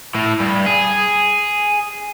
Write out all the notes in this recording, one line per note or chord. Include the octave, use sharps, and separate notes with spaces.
A2
G2
G#4